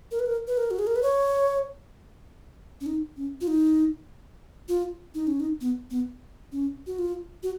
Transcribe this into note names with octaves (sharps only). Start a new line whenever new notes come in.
A#4
B4
A#4
B4
A#4
F#4
G#4
A#4
B4
C#5
C#4
D#4
C#4
F4
D#4
F4
D#4
C#4
D#4
B3
B3
C#4
F#4
F4
F#4